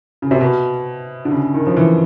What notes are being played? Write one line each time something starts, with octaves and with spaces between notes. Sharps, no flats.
C#3
C3
B2
D3
C#3
D#3
F3
E3